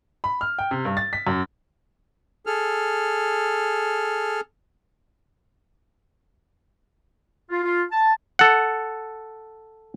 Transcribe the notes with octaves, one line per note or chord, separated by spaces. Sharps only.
B5
F6
G5
C3
G2
A6
B6
F#2
G#4 A4 F6
F4
F4
A5
A4 F#5